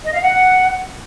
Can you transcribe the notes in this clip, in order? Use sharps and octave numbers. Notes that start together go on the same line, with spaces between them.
D#5
F5
F#5